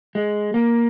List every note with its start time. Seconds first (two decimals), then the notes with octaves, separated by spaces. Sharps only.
0.15 G#3
0.54 A#3